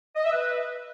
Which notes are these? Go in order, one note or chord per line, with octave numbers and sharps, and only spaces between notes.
D#5
E5
B4